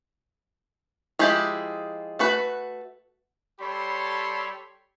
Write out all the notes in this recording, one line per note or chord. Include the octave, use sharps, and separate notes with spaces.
F3 G#3 E4 G4
A3 F#4 B4
G3 G4 A4 C#5 B5 C6